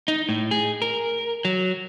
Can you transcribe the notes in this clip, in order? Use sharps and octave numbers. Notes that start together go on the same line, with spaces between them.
D#4
A2
G#4
A#4
F#3